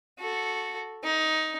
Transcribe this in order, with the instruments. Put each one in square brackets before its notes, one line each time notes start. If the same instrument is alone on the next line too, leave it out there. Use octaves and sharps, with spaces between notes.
[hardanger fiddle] F#4 A4
D#4